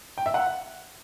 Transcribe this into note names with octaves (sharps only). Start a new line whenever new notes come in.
G5
E5
F#5